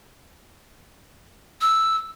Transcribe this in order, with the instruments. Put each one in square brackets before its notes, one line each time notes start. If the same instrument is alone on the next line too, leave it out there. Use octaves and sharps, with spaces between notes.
[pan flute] E6